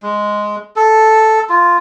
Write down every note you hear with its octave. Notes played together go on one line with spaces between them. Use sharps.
G#3
A4
F4